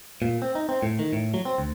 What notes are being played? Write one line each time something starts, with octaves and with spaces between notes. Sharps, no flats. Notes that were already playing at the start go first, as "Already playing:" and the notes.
A#2
C4
D#4
C4
A2
D#3
A2
F#3
C4
D2